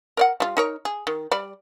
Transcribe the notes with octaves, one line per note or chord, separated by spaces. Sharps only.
A#4 D5 F#5
G3 F4
D#4 A#4 C#5
G#4
D#3
G3 D5 B5